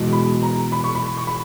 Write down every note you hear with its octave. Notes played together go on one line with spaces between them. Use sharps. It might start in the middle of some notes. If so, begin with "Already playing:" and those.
Already playing: E2 B2 G#3
B5
A#5
B5
C#6
B5
C#6
B5